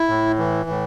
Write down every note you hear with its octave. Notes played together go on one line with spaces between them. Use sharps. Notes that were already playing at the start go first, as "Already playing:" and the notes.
Already playing: E4
A2
E3
A2